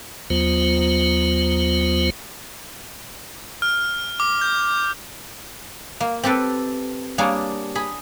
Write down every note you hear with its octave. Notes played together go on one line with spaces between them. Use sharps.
D#2 F#3 B3 F4 C5
F6
D6
G6
A#3
C4 G4 A4 B4
G3 A#3 D4 G#4 C#5
G#4 B5